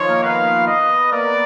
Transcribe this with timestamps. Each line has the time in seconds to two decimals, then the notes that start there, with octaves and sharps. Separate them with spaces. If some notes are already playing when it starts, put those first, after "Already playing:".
Already playing: D#3 F3 D#4 F4 C#5
0.09 A#3 A#4
0.23 B3 B4 F5
0.67 D#5
1.12 A#3 A#4 D5